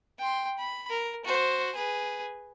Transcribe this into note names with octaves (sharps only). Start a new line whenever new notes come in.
G5 C6
B5
A#4
F#4 C5
G#4 B4